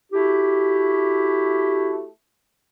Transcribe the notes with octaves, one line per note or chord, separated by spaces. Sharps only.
A3 E4 F#4 G4